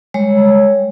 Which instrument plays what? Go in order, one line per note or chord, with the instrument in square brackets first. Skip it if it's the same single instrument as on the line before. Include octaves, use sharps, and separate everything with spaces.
[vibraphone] G3 G#3 C#5